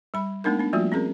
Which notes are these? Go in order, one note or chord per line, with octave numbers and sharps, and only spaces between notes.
G3 B5
G#3 A3 B3 D4 D#4 A#4
B3 D4
F3 G3 A3 A#3 F4 F#4
C4 C#4 G#4 A#4